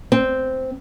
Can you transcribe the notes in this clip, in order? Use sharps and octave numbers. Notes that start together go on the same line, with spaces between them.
C4